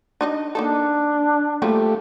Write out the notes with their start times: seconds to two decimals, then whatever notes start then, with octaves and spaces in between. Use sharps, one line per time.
0.21 D4 D#4 D#5
0.55 A#3 D4 D#4 A4
1.62 F3 G3 A3 A#3 G4